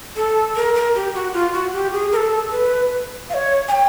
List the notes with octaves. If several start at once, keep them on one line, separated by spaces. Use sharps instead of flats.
A4
A#4
A#4
G4
F#4
F4
F#4
G4
G#4
A#4
A4
B4
F5
C#5
G#5
G5